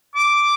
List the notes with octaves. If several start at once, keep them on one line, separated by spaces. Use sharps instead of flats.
D6